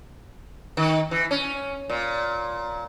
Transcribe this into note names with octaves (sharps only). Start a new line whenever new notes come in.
D#3
E3
C#4
A#2